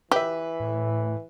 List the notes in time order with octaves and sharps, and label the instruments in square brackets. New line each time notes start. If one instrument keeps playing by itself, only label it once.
[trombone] E3 [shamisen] G4 [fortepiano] B4 E5
[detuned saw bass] A2